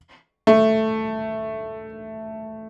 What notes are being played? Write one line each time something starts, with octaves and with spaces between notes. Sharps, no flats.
A3